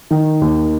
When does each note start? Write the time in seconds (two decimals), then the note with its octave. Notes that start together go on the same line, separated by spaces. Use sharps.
0.11 D#3
0.42 D#2